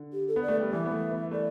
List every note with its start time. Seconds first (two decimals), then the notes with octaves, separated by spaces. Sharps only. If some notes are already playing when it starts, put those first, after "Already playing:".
Already playing: D3
0.13 G4
0.28 A4
0.36 B3
0.42 D5
0.48 A3
0.60 G3
0.72 E3 E5
0.85 B3
0.91 A3
1.11 B3
1.31 A3 D5